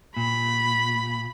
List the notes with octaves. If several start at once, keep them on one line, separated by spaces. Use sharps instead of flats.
A#2 B5